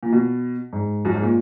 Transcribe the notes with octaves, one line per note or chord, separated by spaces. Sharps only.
A#2
B2
G#2
F#2
G#2
A#2